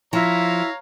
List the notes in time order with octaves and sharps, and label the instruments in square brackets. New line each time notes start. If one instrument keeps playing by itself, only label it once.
[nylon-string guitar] F3 [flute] E4 [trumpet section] C#5 F5 A#5